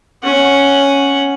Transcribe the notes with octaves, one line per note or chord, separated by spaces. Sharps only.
C#4 F#5